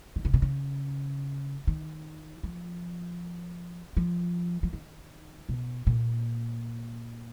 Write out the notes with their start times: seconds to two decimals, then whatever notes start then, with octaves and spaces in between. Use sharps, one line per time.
0.16 D#3
0.25 C#3
0.34 B2
0.42 C#3
1.67 D#3
2.43 F3
3.97 F3
4.63 F3
4.73 D#3
5.49 B2
5.87 A#2